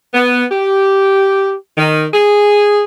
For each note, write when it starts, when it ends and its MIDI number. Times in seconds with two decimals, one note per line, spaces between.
0.14 0.44 59
0.51 1.53 67
1.77 2.06 51
2.14 2.83 68